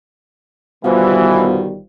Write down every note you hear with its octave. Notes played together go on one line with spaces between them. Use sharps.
G1 B2 D#3 E3 G3 F4 C5 F5